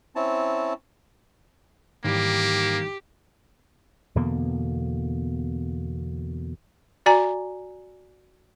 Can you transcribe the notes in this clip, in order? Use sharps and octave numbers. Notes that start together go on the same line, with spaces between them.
C4 C#4 E4 A5
G#2 D#3 E3 G3 A#3 G4
E2 B2 D3 A#3
F#4 D5 G#5 A#5